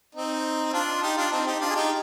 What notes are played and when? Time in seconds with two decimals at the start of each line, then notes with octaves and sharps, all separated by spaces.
0.15 C4 D#4
0.73 D4 F4
1.02 D#4 G4
1.17 D4 F4
1.31 C4 D#4
1.47 D#4 G4
1.60 D4 F4
1.70 G#4
1.75 D#4 G4